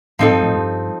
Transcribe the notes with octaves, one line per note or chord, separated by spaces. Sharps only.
A2 F3 C4 D#4 A4
G2
F2 A2
G2